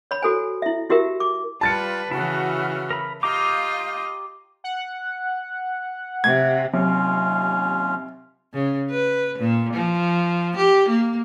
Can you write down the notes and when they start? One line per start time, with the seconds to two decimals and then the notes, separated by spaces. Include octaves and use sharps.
0.11 C#5 B5
0.22 F#4 A4 C5 G#5
0.62 E4 E5
0.89 E4 F#4 G4 A#4 E5
1.20 D6
1.61 G3 F4 B4 A5 A6 C#7
2.11 C#3 E3 E4 F#4 F6
2.91 A#4 B5
3.23 F4 G4 D#5 F5 A#5 D6 G6
4.64 F#5
6.24 C3 G#6
6.73 D#2 C3 F#3 C#4 F4
8.54 C#3
8.90 B4
9.39 A#2
9.74 F3
10.57 G4
10.89 A#3